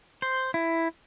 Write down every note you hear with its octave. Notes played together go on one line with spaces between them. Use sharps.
C5
E4